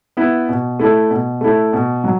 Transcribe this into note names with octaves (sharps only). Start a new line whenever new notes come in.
B3 E4
B2
A3 E4
B2
A3 E4
B2
F#3